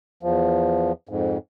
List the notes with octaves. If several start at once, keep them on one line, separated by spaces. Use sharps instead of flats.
E2 F3
F2 G#2